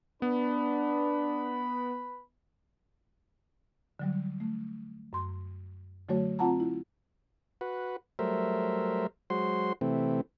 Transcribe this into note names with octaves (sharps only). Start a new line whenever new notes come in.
B3 D4 B4 B5
D3 F#3 G3
A3
F#2 C6
D3 F#3 A3 F#4 C#5
C4 F4 F#5 A5 A#5
E4
F#4 B4
F#3 G3 A3 A#4 C5 E5
F#3 G#3 F#4 C5 C6
C3 E3 A3 C4